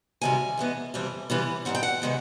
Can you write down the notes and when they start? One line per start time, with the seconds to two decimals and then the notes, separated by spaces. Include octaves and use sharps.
0.21 D2 C3 D#3 G3 G#5
0.57 G2 E3 G#3 B3
0.94 F2 C3 E3 G3 C4
1.30 C3 E3 G3 B3
1.65 G#2 E3 G3 C4 F#5
1.75 G5
1.83 F#5
2.02 C3 D#3 G#3 B3